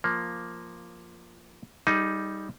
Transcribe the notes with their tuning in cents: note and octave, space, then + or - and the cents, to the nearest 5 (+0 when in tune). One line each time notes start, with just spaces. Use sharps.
F3 +0 A#3 +0
G3 +0 D#4 +10 G#4 +40